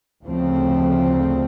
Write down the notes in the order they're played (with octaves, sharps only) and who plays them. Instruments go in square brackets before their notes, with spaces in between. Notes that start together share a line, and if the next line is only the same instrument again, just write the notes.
[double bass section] D2 C#3 F3 A3 C4